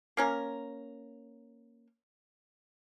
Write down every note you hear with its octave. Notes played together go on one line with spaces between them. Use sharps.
A#3 C#4 A#4